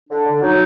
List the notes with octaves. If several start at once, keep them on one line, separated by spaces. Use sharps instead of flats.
D3 D4
D3
F#3 D#4